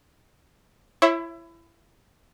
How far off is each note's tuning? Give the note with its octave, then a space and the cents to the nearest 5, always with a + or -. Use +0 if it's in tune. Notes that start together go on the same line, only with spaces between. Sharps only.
E4 +25 C#5 -25 E5 +0